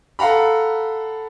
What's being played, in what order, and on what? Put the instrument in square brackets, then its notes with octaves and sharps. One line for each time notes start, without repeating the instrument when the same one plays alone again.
[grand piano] A4 F5 F#5 A#5 B5